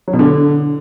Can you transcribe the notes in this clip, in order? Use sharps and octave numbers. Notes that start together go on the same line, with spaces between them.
F#3
B2
D3